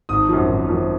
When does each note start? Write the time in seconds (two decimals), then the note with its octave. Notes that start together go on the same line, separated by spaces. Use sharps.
0.09 G#1 D#6
0.29 F#2 F3
0.49 G#1
0.69 F#2 F3